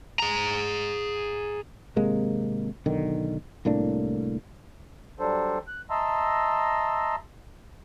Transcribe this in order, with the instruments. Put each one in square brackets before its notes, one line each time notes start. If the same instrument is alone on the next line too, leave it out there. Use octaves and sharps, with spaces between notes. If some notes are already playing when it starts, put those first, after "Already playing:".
[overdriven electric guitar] G#4 A#5
[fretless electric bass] G#1 C3 G#3 A#3
B1 D3 D#3
C2 A2 A#3 D4
[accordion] F#3 G3 D4 A4 C5
F#6
D#5 E5 A5 A#5 C6 E6